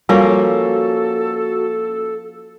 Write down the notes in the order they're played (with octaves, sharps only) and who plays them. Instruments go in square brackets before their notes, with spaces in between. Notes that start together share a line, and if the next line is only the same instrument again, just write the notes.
[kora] F3 A#3 C#4 [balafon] G3 [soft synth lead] F#4 [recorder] A4